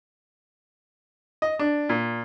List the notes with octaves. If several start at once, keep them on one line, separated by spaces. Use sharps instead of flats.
D#5
D4
A#2